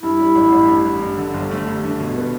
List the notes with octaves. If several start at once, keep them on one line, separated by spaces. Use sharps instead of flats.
G2 E4
G3
A1
A1
G2
G3
G2
D3
G1
A3
G2
D3
B2
B3